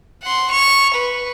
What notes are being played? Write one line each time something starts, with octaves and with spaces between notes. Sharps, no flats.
F#5 C6
C#6 F7
B4